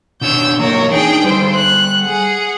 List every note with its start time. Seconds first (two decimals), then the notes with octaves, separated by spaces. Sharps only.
0.21 B2 D4 C#5 E6 G6
0.59 E3 F#3 A#3 A#4 C#5
0.91 D4 D#4 G#4 G5
1.24 G3 G4 A4 C5
1.55 F#6
2.00 G#4 F#5